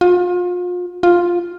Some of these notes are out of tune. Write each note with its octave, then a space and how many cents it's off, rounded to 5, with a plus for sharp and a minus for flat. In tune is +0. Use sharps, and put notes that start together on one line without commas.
F4 +35
F4 +5